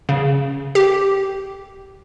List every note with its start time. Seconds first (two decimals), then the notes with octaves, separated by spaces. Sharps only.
0.09 C#3
0.75 G4